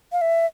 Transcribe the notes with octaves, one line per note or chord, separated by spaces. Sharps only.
F5
E5